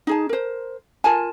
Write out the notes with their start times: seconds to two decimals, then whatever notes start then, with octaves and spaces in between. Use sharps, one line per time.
0.07 D#4 G#4 A5
0.29 A#4 C5
1.04 F4 A#4 G#5 A5